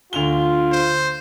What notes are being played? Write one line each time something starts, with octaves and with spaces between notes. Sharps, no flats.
D2 F4 F7 G7
C5